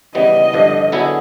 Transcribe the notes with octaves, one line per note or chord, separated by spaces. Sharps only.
C#3 E3 G3 B3 D#5
G2 D3 F3
D3 F#3 B3 E4 G#4